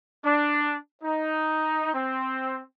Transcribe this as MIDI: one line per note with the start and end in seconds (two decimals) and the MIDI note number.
0.25 0.77 62
1.04 1.94 63
1.94 2.62 60